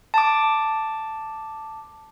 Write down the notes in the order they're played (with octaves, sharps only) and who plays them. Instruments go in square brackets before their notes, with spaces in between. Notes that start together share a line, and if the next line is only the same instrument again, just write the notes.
[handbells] A5 D6